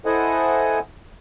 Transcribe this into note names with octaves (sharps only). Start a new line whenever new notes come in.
E4 A4 C5 D#5 F#5 G#5